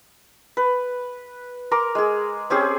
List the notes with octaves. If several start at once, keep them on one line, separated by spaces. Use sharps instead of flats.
B4
A#4 A#5 C6 D6
G#3 G#4
C4 C#4 G4 G#4